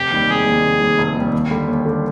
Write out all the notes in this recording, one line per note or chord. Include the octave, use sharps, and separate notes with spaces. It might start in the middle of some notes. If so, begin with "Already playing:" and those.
Already playing: F1 G4
D#2 D#3 G3
F1 G#4
D#2 D#3 G3
F1
D#2 D#3 G3
F1
D#2 D#3 G3
D#2
D3 G3
D#2
D3 G3